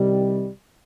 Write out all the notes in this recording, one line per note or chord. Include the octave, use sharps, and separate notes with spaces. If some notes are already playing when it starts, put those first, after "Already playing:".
Already playing: C2 C3 D#3 G3